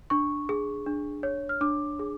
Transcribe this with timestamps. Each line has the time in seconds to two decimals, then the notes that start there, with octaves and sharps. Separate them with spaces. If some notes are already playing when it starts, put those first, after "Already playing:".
0.10 D4 C#6
0.49 G#4
0.86 D4
1.23 C#5
1.49 F6
1.61 D4 D6
1.99 G#4